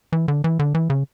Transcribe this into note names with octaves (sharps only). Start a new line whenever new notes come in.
E3
D3
E3
D3
E3
C#3